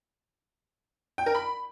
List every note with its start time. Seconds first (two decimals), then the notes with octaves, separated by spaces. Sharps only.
1.18 G5
1.26 A#4
1.35 B5